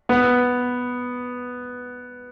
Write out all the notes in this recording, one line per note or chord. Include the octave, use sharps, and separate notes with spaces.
B3